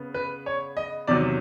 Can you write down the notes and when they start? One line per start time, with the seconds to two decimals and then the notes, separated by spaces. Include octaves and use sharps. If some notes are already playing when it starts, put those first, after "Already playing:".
Already playing: C#3 B3
0.14 B4
0.46 C#5
0.77 D#5
1.07 E2 C3 D#3 F#3 D5